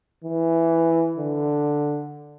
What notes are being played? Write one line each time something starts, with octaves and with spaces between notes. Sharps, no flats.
E3
D3